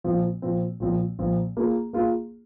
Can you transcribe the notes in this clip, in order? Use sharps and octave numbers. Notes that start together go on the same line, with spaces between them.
A#2 F3 C4
A#2 F3 C4
A#2 F3 C4
A#2 F3 C4
A#3 F4 G#4
A#3 F4 G#4